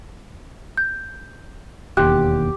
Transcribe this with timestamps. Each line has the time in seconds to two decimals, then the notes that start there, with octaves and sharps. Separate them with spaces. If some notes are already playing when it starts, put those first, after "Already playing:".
0.77 G6
1.97 E1 D#2 G4 C6 F#6